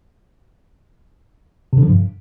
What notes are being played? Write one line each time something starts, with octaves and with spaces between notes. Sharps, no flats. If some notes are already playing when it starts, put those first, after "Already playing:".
C3
D3
F3
G2